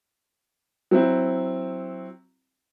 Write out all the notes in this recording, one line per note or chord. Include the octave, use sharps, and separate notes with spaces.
F#3 C4 E4